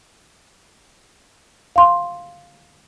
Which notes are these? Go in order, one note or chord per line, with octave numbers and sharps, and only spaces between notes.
F5 C6